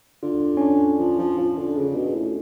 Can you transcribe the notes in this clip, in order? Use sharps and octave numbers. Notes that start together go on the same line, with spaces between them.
D3 F4
C#4
D4
F3
F3
F3
D3
C#3
B2
A2